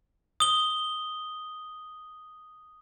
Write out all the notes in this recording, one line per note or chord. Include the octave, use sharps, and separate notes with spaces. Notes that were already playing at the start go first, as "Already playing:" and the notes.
D#6 G7